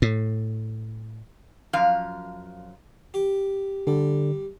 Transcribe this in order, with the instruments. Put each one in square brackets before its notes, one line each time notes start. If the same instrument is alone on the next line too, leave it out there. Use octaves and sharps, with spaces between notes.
[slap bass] A2
[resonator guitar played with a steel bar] F#2 F3 F5
[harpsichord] G4
[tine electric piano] D3 [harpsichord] G3